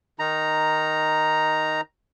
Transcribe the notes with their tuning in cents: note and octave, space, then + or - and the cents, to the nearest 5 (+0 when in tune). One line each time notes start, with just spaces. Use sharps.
D#3 +0 D#4 +0 A#5 +0